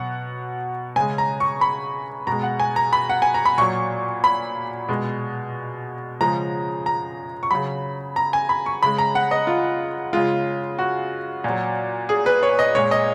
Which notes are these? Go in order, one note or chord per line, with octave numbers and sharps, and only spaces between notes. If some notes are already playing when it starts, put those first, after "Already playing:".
Already playing: B2 F#3 F#5
C#3 G#3 G#5
A#5
C#6
B5
B2 G#3 A#5
F#5
G#5
A#5
B5
F#5
G#5
A#5
B5
A#2 F#3 C#6
B5
B2 G#3
C#3 F3 G#3 A#5
A#5
C#6
C#3 F#3 B5
A#5
G#5
B5
C#6
C#3 G#3 B5
A#5
F#5
D#5
F4
C#3 G#3 F4
F#4
A#2 F#3
G#4
B4
C#5
D#5
A#2 G#3 C#5
D#5